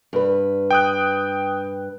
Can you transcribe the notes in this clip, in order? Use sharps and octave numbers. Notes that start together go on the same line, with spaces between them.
G2 B4
G5 D#6 F#6